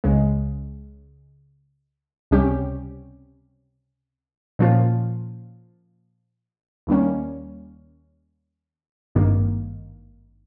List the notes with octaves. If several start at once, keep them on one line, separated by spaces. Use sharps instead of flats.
C#2 C#3 G#3
C#2 C3 G3 C#4 G4
A#2 F3 A#3 C#4 F4
D#2 D#3 G3 A#3 C#4
G#1 G2 D#3 A#3